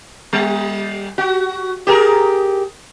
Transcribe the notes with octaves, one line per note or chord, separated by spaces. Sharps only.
G3
F#4
G4 G#4 A#4